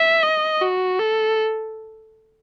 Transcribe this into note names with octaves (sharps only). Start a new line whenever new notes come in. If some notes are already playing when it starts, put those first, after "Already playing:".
Already playing: E5
D#5
F#4
A4